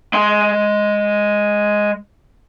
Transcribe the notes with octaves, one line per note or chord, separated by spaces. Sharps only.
G#3 C6